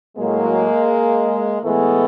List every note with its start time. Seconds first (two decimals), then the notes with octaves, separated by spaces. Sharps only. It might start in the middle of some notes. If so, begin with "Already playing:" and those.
0.17 A2 F#3 G#3 A#3
1.63 A2 E3 G#3 A3 B3